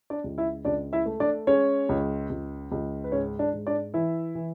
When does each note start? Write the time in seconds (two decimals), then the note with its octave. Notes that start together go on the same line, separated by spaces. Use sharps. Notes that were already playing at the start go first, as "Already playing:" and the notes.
0.10 D4 D5
0.24 C#2
0.38 E4 E5
0.65 C#2 D4 D5
0.93 E4 E5
1.06 A3
1.20 D4 D5
1.47 G#3 C#4 C#5
1.89 C#2
2.30 C#2
2.71 C#2
3.04 B4
3.12 G#2 C#4 C#5
3.39 D4 D5
3.53 G#2
3.67 D4 D5
3.94 E3 E4 E5
4.35 E3